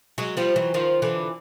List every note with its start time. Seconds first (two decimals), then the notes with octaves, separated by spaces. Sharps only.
0.18 F#3 G#3
0.37 F3 G3
0.56 E3 F#3
0.74 D#3 F3
1.02 D3 E3